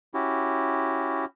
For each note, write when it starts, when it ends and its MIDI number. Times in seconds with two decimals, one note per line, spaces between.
0.14 1.25 61
0.14 1.25 64
0.14 1.25 66
0.14 1.25 67